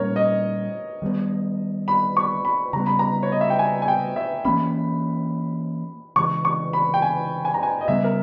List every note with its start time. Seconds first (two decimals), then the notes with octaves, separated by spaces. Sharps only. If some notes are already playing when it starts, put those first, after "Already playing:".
Already playing: A#2 G3 A#3 C#4 A#4 C#5
0.16 D#5
1.02 D#3 G3 B3
1.88 B5
2.17 C#6
2.45 B5
2.73 C#3 G3 B3 A#5
2.86 B5
2.99 A#5
3.23 C#5
3.32 D#5
3.41 E5
3.50 G5
3.59 G#5
3.82 G#5
3.88 G5
4.16 E5
4.45 E3 A#3 C#4 B5
6.16 C#3 E3 G#3 C#6
6.45 C#6
6.73 B5
6.94 G5
7.02 G#5
7.45 G#5
7.54 A#5
7.63 G#5
7.81 D#5
7.88 C#3 G3 B3 E5
8.04 A#4